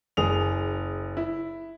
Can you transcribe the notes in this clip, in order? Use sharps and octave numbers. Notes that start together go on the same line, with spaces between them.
F#1 G#4 D#6 F7
E4